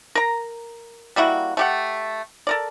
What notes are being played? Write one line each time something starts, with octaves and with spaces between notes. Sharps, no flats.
A#4 A#5
G3 A#3 E4 F#4
A3 G4 F#5
A4 A#4 D5